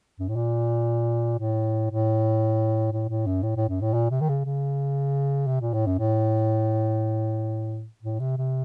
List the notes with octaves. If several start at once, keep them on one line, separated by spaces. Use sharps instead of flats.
F#2
A2
A#2
A2
A2
A2
A2
F#2
A2
A2
F#2
A2
A#2
C3
D#3
C#3
C#3
C3
A#2
A2
F#2
A2
A2
C3
C3